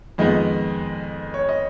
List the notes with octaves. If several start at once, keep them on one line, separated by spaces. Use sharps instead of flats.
F2 D#3 G#3 B3 D#5
C#5
D#5